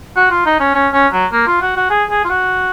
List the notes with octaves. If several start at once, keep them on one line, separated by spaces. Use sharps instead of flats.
F#4
F4
D#4
C#4
C#4
C#4
F#3
A#3
F4
F#4
F#4
G#4
G#4
F4
F#4